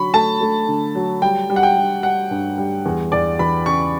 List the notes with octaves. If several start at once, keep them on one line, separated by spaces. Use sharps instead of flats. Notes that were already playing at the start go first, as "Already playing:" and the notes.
Already playing: D3 F#3 B5 C#6
A3 A5
A3
D3
F#3
G3 G5
G3
F#5
G5
G3
G3 F#5
G2
G3
E2
E2 D5
E3 B5
C#3 C#6